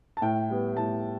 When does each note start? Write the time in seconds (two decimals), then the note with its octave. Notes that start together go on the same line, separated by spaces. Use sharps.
0.17 A5
0.22 A2 G5
0.50 G3 B3
0.77 A2 A5